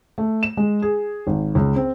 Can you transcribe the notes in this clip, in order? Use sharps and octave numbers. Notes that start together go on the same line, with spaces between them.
A3
E7
G#3
G#4
G#1
C#2
C4